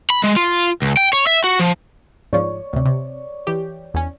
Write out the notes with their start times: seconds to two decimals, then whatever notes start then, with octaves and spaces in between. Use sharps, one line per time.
0.10 B5
0.24 G#3
0.37 F4
0.82 C#2
0.97 G5
1.13 C#5
1.27 E5
1.44 F#4
1.59 F3
2.33 G#2 F3 C#5 D5 C#6
2.73 D2 C3
2.85 C3
3.47 E3 G4
3.94 E2 C#4